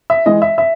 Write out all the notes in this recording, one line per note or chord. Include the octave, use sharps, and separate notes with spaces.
E5
E3 G#3 D#5
E5
E5